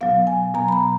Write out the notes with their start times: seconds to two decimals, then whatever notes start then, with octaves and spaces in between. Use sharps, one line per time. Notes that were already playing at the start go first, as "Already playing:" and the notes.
0.01 B2 F#3 B3 F5
0.27 G#5
0.54 B2 F#3 B3 A#5
0.68 B5
0.72 A#5